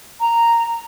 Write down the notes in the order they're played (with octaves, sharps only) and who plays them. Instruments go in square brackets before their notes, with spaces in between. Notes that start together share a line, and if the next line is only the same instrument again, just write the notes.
[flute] A#5